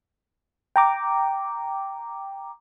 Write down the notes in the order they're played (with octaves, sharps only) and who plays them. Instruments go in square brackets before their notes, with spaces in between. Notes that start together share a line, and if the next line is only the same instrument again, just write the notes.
[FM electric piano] G5 A#5 D6